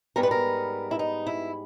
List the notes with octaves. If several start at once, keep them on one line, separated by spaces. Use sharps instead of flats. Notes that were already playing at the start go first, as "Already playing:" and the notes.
G#2 G3 B3 A#4
B4
A#4
E4
D#4
E4